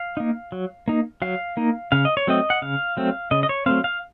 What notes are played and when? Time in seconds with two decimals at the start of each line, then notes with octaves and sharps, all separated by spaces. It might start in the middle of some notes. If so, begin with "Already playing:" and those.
Already playing: F5
0.17 A#3 D#4
0.52 F#3
0.88 A#3 D#4
1.22 F#3 F5
1.57 A#3 D#4
1.92 C#3 F5
2.05 D#5
2.17 C#5
2.27 F#3 A3 C4 D#5
2.50 F#5
2.62 C#3 F5
2.97 F#3 A3 C4
3.31 C#3 D#5
3.43 D#5
3.49 C#5
3.66 F#3 A3 C4 F5
3.84 F5